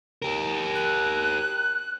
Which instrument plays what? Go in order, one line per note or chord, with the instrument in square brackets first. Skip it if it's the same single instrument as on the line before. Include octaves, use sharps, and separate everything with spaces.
[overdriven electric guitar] G4 A#4
[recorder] F#6